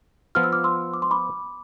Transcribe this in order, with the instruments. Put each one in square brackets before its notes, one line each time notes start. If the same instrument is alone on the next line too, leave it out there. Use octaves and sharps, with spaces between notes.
[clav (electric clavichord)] F3 B3 F4 [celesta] F6
[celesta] E6
D6 F6
C6 E6
D6
C6
B5 D6